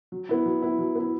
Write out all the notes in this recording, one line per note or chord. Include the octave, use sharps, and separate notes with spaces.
F#3
B3 E4
F#3
B3 E4
F#3
B3 E4